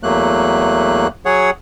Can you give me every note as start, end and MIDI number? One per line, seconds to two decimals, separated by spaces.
0.03 1.07 40
0.03 1.07 54
0.03 1.07 57
0.03 1.07 58
0.03 1.07 90
1.25 1.50 54
1.25 1.50 68
1.25 1.50 73
1.25 1.50 78